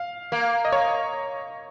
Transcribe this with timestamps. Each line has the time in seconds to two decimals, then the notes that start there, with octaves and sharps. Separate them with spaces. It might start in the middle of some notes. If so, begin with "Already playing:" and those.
Already playing: F5
0.32 A#3
0.65 D#5
0.72 C#5